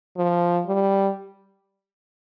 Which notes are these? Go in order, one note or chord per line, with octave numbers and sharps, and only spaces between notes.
F3
G3